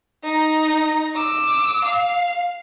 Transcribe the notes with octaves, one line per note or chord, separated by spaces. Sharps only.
D#4 A#5
D6 E6
F5